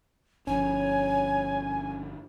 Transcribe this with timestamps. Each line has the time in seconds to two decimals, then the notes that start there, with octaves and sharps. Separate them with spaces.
0.47 G1 F3 C#4 C#5 G#5